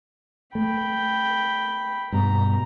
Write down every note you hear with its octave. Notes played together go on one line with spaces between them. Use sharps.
A3 G5 B5
G2 B2 A#5